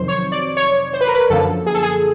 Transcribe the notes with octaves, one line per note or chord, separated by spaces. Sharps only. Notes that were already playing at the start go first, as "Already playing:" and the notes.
Already playing: F2 C3 D#3 F#3 C5
C#5
D5
C#5
C5
B4
A#4
B4
F#2 D3 F3 A#3 A4
G#4
A4
G#4